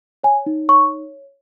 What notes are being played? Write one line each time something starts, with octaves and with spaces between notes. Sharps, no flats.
C#5 G#5
D#4
C#5 C#6